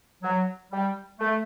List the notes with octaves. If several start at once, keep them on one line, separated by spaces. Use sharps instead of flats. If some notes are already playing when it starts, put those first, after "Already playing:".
F#3
G3
A3